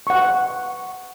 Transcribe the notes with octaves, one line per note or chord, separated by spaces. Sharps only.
F#5 C#6